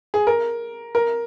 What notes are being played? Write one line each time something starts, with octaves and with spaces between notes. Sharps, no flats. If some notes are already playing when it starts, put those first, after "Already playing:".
G#4
A#4
A#4